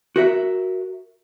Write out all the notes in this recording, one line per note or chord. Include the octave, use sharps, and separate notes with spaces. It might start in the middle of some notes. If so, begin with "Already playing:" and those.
F#4 A#4 E5